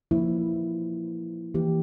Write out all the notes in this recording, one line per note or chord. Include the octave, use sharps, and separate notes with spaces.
F3 A#3 E4
E3 A#3 E4 G4